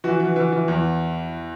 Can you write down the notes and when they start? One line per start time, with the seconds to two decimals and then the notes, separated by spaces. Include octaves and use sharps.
0.04 E3 F#4
0.20 E3
0.36 E3
0.52 E3
0.68 E2